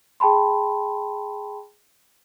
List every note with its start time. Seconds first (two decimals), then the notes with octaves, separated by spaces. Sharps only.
0.20 G#4 G5 A5 B5 C6